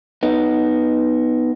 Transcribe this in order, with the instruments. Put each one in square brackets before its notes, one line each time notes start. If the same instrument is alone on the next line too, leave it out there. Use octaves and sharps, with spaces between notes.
[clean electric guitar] B3 D#4